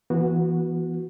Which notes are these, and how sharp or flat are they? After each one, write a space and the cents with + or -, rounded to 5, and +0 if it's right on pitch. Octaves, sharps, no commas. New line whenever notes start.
E3 +20 B3 -25 F#4 -10